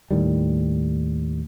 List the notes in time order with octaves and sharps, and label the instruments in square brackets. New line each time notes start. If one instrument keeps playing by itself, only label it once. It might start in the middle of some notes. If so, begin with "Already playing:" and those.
[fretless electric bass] D#2 A2 D#3 G3